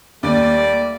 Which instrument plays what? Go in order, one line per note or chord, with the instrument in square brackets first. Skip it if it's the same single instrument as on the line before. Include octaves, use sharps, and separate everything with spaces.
[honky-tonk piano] D#2 [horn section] G3 A3 D5